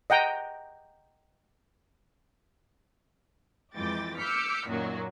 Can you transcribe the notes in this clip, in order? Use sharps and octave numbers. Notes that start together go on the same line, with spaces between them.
D#5 F#5 G5 A#5
F2 E3 G#3 G5 D6 A6
D6 E6 F6 G6 B6 C#7
F#2 A#2 D#3 F#3 A#3 F#4